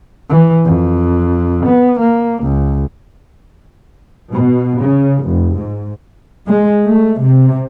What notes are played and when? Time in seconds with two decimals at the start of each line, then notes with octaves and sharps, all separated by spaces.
0.30 E3
0.65 F2
1.66 B3
2.00 A#3
2.43 C#2
4.30 B2
4.80 C#3
5.22 F1
5.54 G#2
6.46 G#3
6.84 A3
7.20 C3